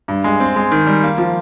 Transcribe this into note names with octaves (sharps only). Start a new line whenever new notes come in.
G2
G#3
C4
G#3
D#3
G3
A#3
F3